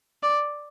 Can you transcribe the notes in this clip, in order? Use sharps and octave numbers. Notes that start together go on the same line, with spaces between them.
D5